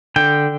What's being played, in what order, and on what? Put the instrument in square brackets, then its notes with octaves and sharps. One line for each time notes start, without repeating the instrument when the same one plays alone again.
[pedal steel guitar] D3 G5